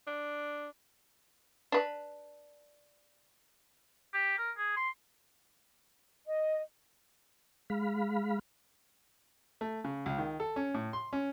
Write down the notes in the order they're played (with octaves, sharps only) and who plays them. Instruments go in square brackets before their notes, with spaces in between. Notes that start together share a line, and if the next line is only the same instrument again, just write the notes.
[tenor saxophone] D4
[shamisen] D4 B4
[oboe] G4
A#4
G#4
C6
[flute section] D#5
[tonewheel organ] G#3 F5 B5
[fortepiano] A3
C#3
C#2
D#3
A4
C#4
A2
C6
C#4